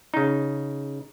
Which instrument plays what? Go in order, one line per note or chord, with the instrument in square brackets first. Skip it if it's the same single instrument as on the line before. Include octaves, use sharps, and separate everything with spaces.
[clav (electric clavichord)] C#3 D#4